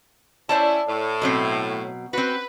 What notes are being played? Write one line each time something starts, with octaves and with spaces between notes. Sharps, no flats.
C#4 E4 C5 D5 A5
A2
B2 F#3 C4
C4 F#4 B4